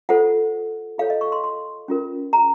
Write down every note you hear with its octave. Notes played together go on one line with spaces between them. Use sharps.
F4 A4 C5 F#5
F4 A4 C#5 F5
D#5
C#6
C6
C6
C#4 F4 A#4
A#5